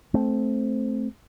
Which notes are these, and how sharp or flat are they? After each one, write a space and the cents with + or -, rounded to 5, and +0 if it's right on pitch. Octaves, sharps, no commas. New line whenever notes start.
A3 -15 C4 +0